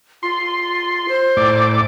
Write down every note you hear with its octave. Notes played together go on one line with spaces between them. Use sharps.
F4 C6
C5
A2 D5 D6